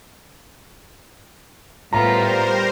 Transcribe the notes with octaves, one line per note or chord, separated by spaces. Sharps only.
A2 G3 B3 F4 A#4 C5 A#5